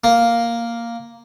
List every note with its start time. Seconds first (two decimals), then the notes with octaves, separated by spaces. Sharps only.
0.04 A#3